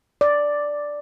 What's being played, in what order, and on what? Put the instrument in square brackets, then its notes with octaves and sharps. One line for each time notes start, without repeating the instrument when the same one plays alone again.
[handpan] D5